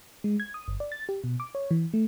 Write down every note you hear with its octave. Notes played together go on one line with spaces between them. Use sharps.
G#3
G#6
D#6
G1
D5
A6
G4
B2
D6
C#5
E3
A3